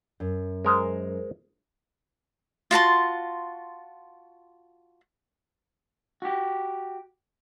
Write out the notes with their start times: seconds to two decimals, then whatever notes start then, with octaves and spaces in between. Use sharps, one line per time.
0.20 F#2
0.65 G#3 A#4 C5
2.71 F4 F#4 A5 C6
6.22 F#4 G4